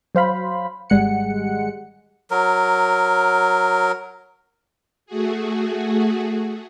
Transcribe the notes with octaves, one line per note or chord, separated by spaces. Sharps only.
F#3 C5 F5 B5
G#1 G3 G#3 F#5 C#7
F#3 A#4
A3 F#4 G#4